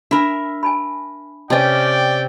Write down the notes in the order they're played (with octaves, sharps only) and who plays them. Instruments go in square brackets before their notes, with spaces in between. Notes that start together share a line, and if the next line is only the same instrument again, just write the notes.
[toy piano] D4 G#5 B5 [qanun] A#4 E5
[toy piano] G#5 A5 B5
[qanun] C3 C#4 [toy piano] B4 D#5 A5 [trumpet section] D5 G5